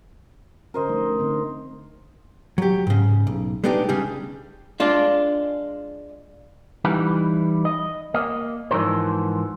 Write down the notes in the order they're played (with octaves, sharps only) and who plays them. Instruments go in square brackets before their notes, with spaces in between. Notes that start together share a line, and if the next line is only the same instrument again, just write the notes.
[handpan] D3 C#4 [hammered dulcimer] A#4 C5 D#5
[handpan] F3 A3 D#4
D3 C4 D#4
[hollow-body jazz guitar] F#3 G4
G#2 C#3
B1
G#3 A3 B3 D4 D#4 G4
C#3 G3 D4 G4 G#4
G#3 D4 F4
[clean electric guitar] E3 G3 D#4 E4 B4
D#5
A#3 D#5
G#2 E3 F3 D#4 A#4 C5